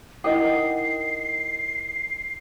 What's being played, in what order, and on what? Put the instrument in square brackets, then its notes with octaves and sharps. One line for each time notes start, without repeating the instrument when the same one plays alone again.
[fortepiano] D#4 D#5 D#6 [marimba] E4 A#4 F#5 [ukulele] G5 [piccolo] C7